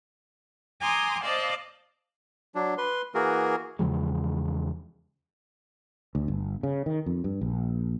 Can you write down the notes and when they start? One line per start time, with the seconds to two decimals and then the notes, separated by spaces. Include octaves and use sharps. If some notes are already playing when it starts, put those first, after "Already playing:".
0.82 G#5 A#5 C6 D6 D#6
1.23 C5 D5 D#5 F5 A5
2.55 F#3 D4
2.78 B4 C6
3.15 E3 A#3 F#4 G#4 A#4
3.79 E2 C#3 F3 G#3
6.15 D2
6.28 G1
6.63 C#3
6.86 D#3
7.06 F2
7.24 G2
7.41 A#1